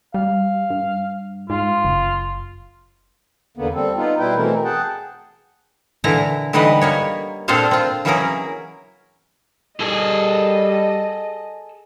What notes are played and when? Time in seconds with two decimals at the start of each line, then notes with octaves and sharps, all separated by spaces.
0.14 G3 F5
0.70 G2
1.50 G#2 F4
1.84 F#1
3.57 E2 D3 A#3 B3
3.74 G3 C4 A4
3.97 B3 D#4 F4
4.19 B2 G3 E4 B4 G5
4.36 B2 E3 A3 C4 A#4
4.64 G#4 F#5 G5 A5
6.04 A#2 D3 E3 E4 A#5
6.53 D3 E3 G3 D#4 B4 D#5
6.81 A#3 B3 C#5
7.48 A#2 C4 D4 A4 C5 F5
7.71 C4 F4
8.05 E3 F#3 A#3 C#4 G#4 A#4
9.80 G3 G#4 A4 D#5